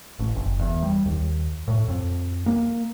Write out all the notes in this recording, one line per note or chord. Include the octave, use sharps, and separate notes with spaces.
A1
F#1
E2
G3
D#2
A2
F2
A#3